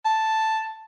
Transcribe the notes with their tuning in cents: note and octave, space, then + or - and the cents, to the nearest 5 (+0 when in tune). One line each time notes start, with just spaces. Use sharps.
A5 +0